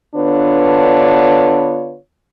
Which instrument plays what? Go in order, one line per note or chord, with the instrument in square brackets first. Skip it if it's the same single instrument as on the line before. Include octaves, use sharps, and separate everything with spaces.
[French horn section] D3 B3 D4 F4 B4 C#5